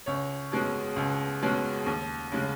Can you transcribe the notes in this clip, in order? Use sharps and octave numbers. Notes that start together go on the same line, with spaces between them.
C#2 C#5
B2 G#3 C#4
C#2
B2 G#3 C#4
D#2
C#3 G#3